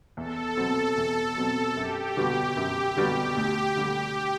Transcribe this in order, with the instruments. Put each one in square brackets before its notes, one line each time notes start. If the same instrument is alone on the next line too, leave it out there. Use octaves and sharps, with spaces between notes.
[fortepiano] E2 [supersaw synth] A4
[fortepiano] B2 F#3 C4
E2
B2 F#3 C4
[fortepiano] F#2 [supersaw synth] G4
[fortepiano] D3 G3 B3 F#4
[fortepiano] F#2 [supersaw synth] G4
[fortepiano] D3 G3 B3 F#4
[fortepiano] D2 [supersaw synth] G4
[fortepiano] D3 G3 [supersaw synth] G4